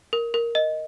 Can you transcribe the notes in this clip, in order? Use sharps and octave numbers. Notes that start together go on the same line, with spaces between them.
A#4
A#4
D#5